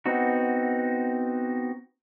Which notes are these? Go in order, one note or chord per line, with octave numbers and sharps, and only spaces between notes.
B3 C4 D#4 F#4